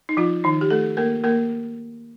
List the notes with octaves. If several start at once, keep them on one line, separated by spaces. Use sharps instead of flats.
D#4
F3 F4
D#3 D#4
G4
A3 A4
A#3 A#4
A#3 A#4